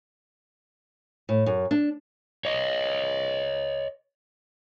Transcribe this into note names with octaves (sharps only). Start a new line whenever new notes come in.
A2
F#2
D4
C#5 D#5